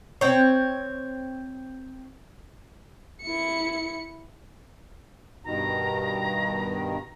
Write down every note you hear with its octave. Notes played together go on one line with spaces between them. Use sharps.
C4 C#5
E4 C#7
G2 B2 D#3 A#5